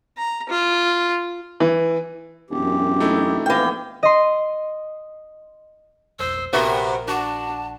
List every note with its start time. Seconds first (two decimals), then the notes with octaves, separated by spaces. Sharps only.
0.18 A#5
0.49 F4
1.60 E3
2.50 E1 F#2 G4
3.00 A3 D#4 E4
3.46 A#1 E3 B3 C4 F5 G5
4.03 D#5 C6
6.19 F1 B1 F2 C5 E6
6.53 A#1 C3 B3 F#4 A#4 E5
7.08 D4 F#4 A5